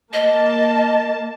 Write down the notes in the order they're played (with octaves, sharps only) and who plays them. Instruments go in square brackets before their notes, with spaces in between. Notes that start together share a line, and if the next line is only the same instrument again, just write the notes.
[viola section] A#3 A5 [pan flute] D#5